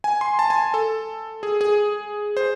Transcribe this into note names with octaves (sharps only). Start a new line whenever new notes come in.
G#5
C6
A5
G#5
A4
G#4
G#4
C5